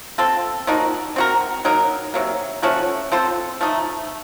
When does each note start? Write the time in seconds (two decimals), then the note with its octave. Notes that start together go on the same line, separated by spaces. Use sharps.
0.18 C4 F4 A4
0.67 F3 A#3 D#4 F#4
1.16 C4 F#4 A#4
1.65 F#3 A#3 D#4 A#4
2.14 C3 F#3 A#3
2.62 F3 A3 C#4 F#4
3.12 C4 F4 A4 C5
3.61 F3 A3 D#4